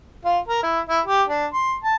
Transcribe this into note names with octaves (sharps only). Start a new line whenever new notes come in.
F4
A#4
E4
E4
G4
D4
C6
A5